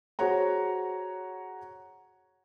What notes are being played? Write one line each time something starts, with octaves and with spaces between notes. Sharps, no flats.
F#4 G#4 C5 C#5 F#5 A#5